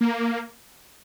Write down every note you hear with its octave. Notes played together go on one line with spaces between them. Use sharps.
A#3